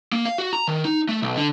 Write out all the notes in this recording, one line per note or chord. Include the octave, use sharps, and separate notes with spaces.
A#3
F5
F#4
A#5
D#3
D#4
A3
B1
D3